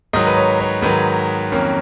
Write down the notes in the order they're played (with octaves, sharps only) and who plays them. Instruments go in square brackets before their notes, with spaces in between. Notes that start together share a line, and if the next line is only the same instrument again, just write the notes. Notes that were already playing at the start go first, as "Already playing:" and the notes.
[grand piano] G#2 D#3 F#3 D#5
B4
C#5
C#5
G#2 D#3 F#3 B4
F2 D#3 F#3 A#3 C#4